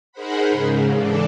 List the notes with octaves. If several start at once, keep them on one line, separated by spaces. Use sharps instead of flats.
D#4 G#4 A#4 C5 F#5 B5
G#2 C#3
E3 D4 A4 D5